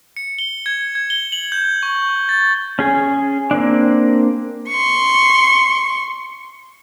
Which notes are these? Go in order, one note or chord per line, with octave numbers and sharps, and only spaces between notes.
C#7
G7
G#6
G#6
G7
F#7
G6
C#6
A6
C#4 G#4 G#5
A#3 C4 D4
C6 C#6